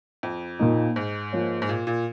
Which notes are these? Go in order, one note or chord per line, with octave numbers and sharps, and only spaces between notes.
F2
A#2 A#3 D#4
G#2
F3 A#3 F4 C#5
G#2
A#2
A#2